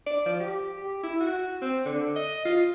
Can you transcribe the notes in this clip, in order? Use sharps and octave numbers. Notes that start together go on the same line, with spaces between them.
D5
F3
G4
G4
E4
F#4
C4
D3
D#5
F4